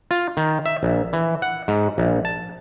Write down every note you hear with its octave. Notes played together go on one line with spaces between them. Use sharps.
F4
D#3
E5
A#1
E3
F#5
G#2
A#1
A5